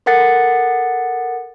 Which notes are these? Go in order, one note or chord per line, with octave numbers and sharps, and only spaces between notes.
A4 A#4 F#5 A6 C#7